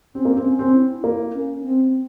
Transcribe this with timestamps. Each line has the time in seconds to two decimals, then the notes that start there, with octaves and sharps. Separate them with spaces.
0.15 C4 C#4
0.25 A#3
0.37 C4
0.45 C#4
0.59 C4
0.74 E4
1.04 A#3
1.35 C#4
1.60 C#4
1.64 C4